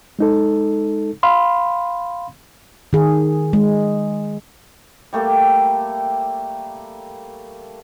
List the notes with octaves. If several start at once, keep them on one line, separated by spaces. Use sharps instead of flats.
G#3 D#4 A4
F5 B5 C6
D#3 G#4
G#3
G3 A3 A#3 G4